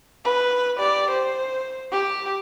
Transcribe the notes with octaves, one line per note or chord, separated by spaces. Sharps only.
B4
G4 D5
C5
G4